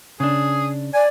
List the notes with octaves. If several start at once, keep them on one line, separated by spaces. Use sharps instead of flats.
C#3 D4 G#4
D5 G#5